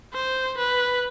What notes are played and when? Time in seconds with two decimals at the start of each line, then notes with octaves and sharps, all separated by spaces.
0.14 C5
0.58 B4